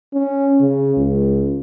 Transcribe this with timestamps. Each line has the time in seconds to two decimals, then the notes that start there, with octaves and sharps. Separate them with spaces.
0.14 C#4
0.60 C#3
0.97 C#2